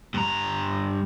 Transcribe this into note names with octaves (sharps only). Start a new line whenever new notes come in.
G2 A#5